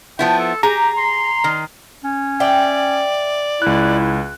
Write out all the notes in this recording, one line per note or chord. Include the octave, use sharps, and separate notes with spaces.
F3 B3 E4 G5
A4
G4 G#4 A#5
C6
D#3
C#4
D5 E5 G5
C#2 E4 F#6